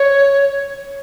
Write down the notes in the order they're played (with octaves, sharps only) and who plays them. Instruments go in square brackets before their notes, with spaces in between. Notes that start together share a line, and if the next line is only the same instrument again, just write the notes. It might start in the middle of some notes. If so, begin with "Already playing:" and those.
Already playing: [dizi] C#5